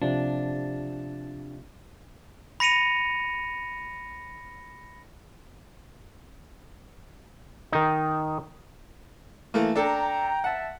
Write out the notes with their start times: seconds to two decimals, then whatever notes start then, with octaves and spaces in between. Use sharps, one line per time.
0.02 C3 F3 D4
2.60 B5 A#6 C#7 D#7 F7
7.72 D#3 D#4
9.54 E3 A3 A#3
9.76 D4 A4 G5 A#5
10.44 E5 F#5 A5